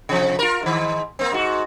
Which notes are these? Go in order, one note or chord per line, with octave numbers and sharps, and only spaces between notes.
C3 F3
F4 A#4
G#2 D#3
A#3 C4
G#2 F#4